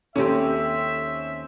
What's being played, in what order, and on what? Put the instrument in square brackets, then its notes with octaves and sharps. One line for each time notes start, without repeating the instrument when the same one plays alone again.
[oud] D#2 G4 [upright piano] C4 C#4 [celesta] A4 A#5 [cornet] E5